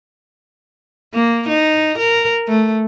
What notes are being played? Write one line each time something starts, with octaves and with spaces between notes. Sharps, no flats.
A#3
D#4
A#4
A3